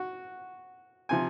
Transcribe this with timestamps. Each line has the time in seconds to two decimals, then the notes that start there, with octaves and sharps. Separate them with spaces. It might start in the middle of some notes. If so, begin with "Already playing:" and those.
Already playing: F#4
1.09 C3 F3 G#5